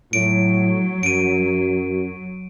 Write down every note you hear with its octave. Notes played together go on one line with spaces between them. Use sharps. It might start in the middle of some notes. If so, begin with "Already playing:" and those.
A2 F#3 D7
F#2 D7 D#7